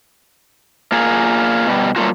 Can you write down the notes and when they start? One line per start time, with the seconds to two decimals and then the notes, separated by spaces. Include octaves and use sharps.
0.92 A#3 F4 G#4
1.67 B2 F3 G3
1.96 F#3 G3 A3 A#3 F4 F#4